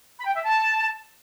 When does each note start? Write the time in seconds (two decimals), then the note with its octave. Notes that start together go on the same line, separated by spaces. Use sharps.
0.19 B5
0.27 G5
0.35 E5
0.42 A5